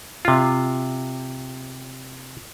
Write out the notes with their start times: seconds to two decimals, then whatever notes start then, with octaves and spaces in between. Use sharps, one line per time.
0.25 C3 F4